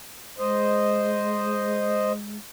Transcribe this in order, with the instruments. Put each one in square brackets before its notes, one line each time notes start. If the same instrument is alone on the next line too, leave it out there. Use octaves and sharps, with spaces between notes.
[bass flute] G#3 [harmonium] C5 D#5